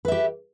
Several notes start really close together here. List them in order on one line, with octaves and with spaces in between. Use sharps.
B4 E5 G4